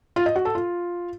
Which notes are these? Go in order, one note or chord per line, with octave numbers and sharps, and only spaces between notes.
F4
D#5
F#4
A4
F4